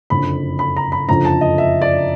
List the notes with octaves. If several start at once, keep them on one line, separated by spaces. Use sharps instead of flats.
F#1 F2 D3 B5
B5
A#5
B5
F#1 F2 D3 F3 A#5
A5
D#5
E5
D5